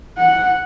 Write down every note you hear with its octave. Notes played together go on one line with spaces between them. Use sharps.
F#5